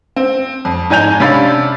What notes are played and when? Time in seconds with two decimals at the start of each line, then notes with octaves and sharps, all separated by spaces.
0.16 C4
0.65 F2
0.90 G#2 D#4 G#5 G6 F7
1.20 C3 C#4 D4 F5 B5 A6